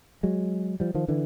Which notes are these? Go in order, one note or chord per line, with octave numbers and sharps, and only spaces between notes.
F#3 G#3
F3 G3
D#3 F3
D3 E3